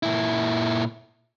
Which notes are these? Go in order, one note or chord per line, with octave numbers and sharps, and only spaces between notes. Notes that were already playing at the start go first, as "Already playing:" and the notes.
A#2 E4